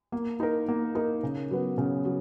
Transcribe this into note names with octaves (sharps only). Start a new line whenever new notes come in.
A#3
D#4 A#4
A#3
D#4 A#4
C#3
F#3 B3
C#3
F#3